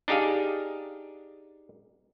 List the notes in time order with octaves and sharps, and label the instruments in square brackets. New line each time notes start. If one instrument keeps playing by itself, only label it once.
[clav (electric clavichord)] D4 D#4 G4 G#4 F5